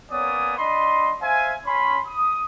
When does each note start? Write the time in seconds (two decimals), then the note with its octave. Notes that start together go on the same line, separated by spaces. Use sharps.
0.11 A#3 B3 C#4 C#5 D5 D#6
0.57 D4 D#5 B5 C6
1.21 C5 E5 F5 G#5
1.65 C#4 B5 C6
2.06 D#6